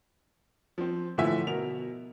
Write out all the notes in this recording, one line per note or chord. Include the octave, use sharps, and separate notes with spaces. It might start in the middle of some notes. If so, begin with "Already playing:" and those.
F3 C4
A2 D3 E3 F3 E5 G#5
B2 A#4 F7